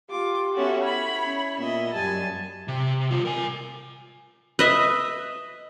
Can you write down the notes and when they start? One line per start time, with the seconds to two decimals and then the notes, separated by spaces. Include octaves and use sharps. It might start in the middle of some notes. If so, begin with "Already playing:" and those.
0.10 F4 G4 D6
0.54 B3 C#4 F#4 A4 E5
0.83 E4 C#5 B5
1.26 C#4
1.59 A#2 B3 D#5 E5
1.93 F#2 G3 G#5 A5
2.68 C3
3.11 G3 F4
3.25 A#4 G#5
4.59 B4 D#5 E5